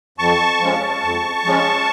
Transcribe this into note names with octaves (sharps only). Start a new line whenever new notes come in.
F2 A5 C#6
F3 G#3 C#4
F2
F3 G#3 C#4